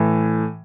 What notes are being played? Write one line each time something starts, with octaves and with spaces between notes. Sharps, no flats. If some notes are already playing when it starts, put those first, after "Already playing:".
Already playing: A2 E3